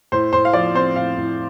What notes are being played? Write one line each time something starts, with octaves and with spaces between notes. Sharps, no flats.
A2 C5
A2 C5
F5
F3 D5
C4 C5
A2 F5
A2